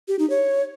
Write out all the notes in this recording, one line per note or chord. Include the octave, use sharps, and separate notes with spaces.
G4
D#4
C#5